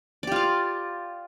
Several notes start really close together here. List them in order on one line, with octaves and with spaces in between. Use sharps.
D5 G4 F4 F5